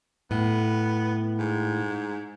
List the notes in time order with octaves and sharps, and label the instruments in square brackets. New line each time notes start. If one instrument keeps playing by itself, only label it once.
[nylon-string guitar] A2 [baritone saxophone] B3
[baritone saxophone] G#2